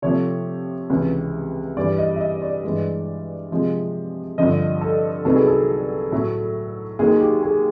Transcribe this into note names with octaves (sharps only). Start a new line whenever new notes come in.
C3 F3 A3 C#5
C#2 C3 E3
G2 E3 G3 D5
D#5
E5
D#5
D5
G2 E3 G#3
C3 F3 G#3
G2 D3 F3 D#5
A4
C2 C3 D#3 F#3 B3 A4
G#4
A4
A2 F#3 A3
D#2 D#3 F#3 G#4
G4
G#4